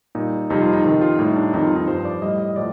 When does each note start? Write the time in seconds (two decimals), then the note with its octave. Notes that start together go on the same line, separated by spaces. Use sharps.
0.15 A#2 G3 D#4
0.50 F2 C3 G3 D#4
0.61 F4
0.73 D#4
0.84 F2 C3 D#3 D#4
1.01 F4
1.19 A2 G3 D#4
1.36 D4
1.53 F2 D#3 G3 D#4
1.65 F4
1.76 D#4
1.88 G2 F3 C5
2.05 D5
2.22 A2 G3 D#5
2.39 D#5
2.56 A2 F3 D5